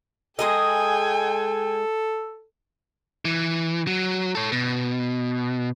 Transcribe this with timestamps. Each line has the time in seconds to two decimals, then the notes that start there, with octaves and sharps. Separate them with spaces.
0.39 G#3 G#4 A4 D#5 G5 G#5
3.25 E3
3.87 F#3
4.35 A4 C#5
4.52 B2